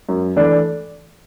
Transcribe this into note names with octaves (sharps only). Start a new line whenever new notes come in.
F#2
E3 A3 D4